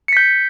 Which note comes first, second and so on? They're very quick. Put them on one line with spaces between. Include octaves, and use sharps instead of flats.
C#7 B6 G6